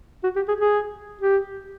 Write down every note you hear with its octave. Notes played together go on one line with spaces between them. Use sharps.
F#4
G4
G#4
G#4
G4